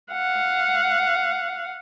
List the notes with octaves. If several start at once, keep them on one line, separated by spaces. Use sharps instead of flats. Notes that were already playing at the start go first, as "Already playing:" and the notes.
F5 F#5